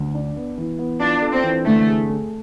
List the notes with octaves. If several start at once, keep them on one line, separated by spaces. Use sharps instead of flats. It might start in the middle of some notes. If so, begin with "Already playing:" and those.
Already playing: D2
D4
B3
E3
B3
D4 F4
A4
C4
E3
D3 A3
G#4
A3